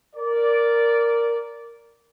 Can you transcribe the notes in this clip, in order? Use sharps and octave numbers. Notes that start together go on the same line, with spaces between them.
A#4 D5